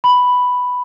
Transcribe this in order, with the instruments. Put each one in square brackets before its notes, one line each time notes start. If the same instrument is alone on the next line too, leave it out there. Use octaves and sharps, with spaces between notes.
[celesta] B5